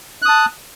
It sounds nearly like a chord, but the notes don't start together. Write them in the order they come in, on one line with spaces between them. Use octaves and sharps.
F#6 D#6 A5